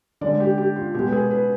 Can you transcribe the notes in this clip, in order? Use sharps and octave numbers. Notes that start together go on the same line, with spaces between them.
D3 G#3 D5
G4
G4
F4
B2 G#3 G4
B4
G#4
B4